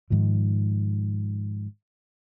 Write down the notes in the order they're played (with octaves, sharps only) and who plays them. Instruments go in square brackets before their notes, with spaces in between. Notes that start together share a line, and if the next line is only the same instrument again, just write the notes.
[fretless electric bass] G#2 D#3 F3